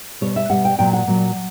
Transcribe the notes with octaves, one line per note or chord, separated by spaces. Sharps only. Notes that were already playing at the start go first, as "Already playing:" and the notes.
B2 G3 C#5
E5
B2 G3 F#5
G5
A#2 F#3 G5
F#5
A#2 F#3